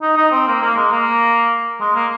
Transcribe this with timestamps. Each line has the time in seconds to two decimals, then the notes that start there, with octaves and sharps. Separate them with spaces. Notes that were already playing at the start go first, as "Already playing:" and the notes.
0.02 D#4
0.17 D#4
0.32 C4
0.47 A#3
0.62 A#3
0.76 G#3
0.92 A#3
1.81 G#3
1.95 A#3